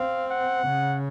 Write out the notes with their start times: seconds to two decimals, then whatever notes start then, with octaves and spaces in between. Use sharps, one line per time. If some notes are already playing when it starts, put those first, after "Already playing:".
Already playing: C4 F5
0.31 F#5
0.67 C#3